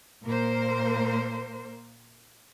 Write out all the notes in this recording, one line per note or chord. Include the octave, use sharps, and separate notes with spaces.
A#2 A#3 A#4 C5